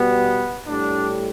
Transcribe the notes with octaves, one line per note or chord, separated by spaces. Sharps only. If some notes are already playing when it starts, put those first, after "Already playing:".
Already playing: B2 G3 B3
A2 G3 D4